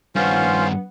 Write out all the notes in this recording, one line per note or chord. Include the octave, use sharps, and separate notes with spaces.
G2 D#3 B3 C#4 F4 C5